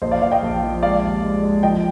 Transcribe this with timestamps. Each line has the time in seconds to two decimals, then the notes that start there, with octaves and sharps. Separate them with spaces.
0.02 A#1 C5 D#5
0.11 D5 F5
0.22 A#1 D5 F5
0.31 D#5 G5
0.42 A#1
0.62 F3
0.82 G#3 D5 F5
1.03 D#2
1.23 G#3
1.43 G#3
1.63 F3 D#5 G5